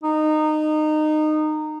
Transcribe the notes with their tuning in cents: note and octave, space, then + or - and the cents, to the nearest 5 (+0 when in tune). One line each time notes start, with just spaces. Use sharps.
D#4 -20